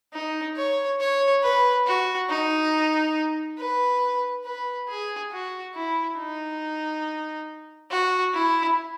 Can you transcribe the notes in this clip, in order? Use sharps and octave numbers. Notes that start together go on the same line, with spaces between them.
D#4
C#5
C#5
B4
F#4
D#4
B4
B4
G#4
F#4
E4
D#4
F#4
E4